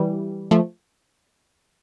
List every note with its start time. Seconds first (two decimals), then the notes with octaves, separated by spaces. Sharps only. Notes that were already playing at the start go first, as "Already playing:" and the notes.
Already playing: E3 G3
0.51 F3 A3